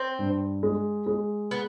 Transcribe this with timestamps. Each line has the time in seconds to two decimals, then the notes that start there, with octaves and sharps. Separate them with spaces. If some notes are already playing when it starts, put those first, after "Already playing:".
Already playing: C4
0.19 G2
0.63 G#3
1.07 G#3
1.51 B3